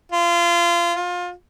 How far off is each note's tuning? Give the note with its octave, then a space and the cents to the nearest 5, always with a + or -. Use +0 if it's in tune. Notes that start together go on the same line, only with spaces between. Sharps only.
F4 -25
F4 +25